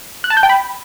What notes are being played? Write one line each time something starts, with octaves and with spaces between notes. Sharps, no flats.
F#6
A5
G6
G5
B5